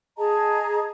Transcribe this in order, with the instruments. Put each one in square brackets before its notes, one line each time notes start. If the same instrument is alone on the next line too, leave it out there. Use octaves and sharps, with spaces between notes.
[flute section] G#4 D#5 A5 A#5